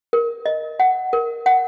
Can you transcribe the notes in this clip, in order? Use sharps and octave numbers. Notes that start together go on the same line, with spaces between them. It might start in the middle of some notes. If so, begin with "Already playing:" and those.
A#4
D#5
F#5
A#4
F#5